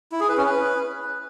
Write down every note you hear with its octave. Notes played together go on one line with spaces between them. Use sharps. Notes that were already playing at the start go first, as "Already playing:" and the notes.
E4
G#4
B4
C#4
B4